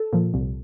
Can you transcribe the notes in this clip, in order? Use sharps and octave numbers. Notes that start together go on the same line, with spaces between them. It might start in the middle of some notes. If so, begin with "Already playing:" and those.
Already playing: A4
A#2 F3
C2